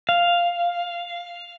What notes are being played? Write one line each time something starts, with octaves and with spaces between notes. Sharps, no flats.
F5